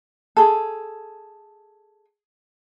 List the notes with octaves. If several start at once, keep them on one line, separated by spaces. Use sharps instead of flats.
G#4 A4